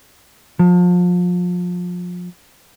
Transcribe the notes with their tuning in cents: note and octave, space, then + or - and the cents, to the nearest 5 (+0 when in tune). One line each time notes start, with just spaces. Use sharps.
F3 +30